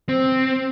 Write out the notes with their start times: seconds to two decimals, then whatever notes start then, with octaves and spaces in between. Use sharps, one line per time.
0.09 C4